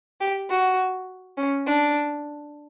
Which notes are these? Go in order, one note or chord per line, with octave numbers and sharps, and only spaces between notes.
G4
F#4
C#4
D4